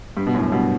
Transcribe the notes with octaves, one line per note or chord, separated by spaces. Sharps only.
G2
B2
F#2 A2
G2 B2